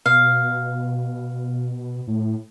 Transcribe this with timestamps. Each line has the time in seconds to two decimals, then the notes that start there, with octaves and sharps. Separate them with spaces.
0.06 B2 F5
2.07 A2